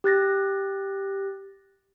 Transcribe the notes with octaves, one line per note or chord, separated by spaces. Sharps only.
G4 F#6 A6 A#6